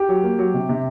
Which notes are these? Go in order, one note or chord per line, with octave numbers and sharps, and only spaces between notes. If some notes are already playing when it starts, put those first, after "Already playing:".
Already playing: G4
F#3
A#3
F#3
C3
C3